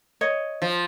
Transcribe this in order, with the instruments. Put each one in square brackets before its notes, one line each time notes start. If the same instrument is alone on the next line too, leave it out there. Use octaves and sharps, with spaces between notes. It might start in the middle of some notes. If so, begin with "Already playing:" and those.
[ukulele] C#5 D#5
[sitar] F3